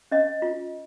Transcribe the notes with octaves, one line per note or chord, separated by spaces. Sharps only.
C#4 D#5
F4